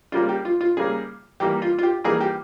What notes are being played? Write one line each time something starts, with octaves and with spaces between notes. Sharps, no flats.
C#3 G3 A#3 F4
G4
F4
F4
C#3 G3 A#3 G#4
E3 G3 A#3 G4
F4
F4
G4
E3 G3 A#3 G#4
G4